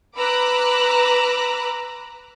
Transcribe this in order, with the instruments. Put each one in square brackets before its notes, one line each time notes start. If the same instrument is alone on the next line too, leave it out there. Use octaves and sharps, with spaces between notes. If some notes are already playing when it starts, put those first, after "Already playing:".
[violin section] B4 A#5 B5 D6 E6 F#6